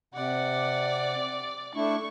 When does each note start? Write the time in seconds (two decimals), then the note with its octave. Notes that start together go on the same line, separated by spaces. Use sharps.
0.14 C3 D5 F#5
1.75 A3 D4 E4 C#6